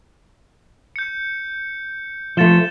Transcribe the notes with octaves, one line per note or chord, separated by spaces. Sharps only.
G6 C#7
F3 A3 A6 E7 G7